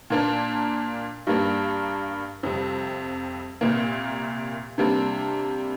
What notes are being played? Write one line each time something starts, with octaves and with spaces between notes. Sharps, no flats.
A#2 A#3 D4
G2 G3 A#3 D4
F2 C3 G3
C2 A#2 A#3
C3 G3 A#3 D4